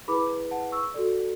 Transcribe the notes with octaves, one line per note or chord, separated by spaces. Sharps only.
E4 G#4 B4 B5 D6
F#5 A5
C#6 E6
F#4 A4 D5